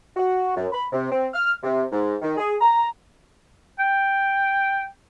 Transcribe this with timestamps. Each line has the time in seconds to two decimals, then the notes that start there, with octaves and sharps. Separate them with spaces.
0.17 F#4
0.56 F#2
0.72 B5
0.92 C3
1.11 C4
1.33 F6
1.63 C3
1.91 G#2
2.21 D#3
2.37 G#4
2.61 A#5
3.79 G5